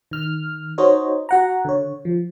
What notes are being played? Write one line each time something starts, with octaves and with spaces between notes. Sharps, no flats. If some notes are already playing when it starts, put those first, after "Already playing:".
D#3 F6
D#4 F#4 C5 C#5 D#5
F#4 F#5 A#5
D3 C#5
F3